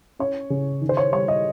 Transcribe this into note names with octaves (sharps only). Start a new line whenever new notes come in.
C#4 C#5
C#3
D#3
C5
C#5
G3 C#5
D#5